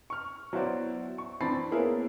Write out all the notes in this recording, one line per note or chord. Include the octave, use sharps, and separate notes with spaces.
C#6 F6
F#3 B3 E4 F#4 C5 D5
C#6
E3 C4 D4 B5 A6 C7
A#3 B3 C#4 E4 G#4 A#4